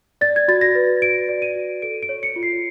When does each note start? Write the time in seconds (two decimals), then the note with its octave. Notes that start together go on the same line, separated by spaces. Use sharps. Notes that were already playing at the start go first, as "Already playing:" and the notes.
0.21 D5 A6
0.36 G#6
0.48 F#4 A6
0.61 A#6
0.75 B4
1.02 F#4 D7
1.29 D5
1.42 D#7
1.56 F#4
1.82 A4 D7
2.03 D7
2.09 C#5
2.23 C#7
2.36 F4
2.43 C7